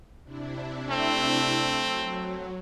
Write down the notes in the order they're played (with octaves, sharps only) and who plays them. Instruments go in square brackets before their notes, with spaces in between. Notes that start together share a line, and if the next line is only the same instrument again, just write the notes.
[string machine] C3 D4 E4
[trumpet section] A3 C4
[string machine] F#3